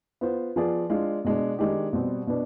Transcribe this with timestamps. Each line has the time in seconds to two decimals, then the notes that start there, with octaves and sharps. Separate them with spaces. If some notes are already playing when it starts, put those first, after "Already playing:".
0.21 B3 F4 C5
0.56 F3 B3 F4 G#4 D5
0.90 G#3 D4 F4
1.25 B2 G#3 D4
1.59 D#3 G#3 D4 G4
1.93 B2 G3 C4
2.27 B2 B3 D4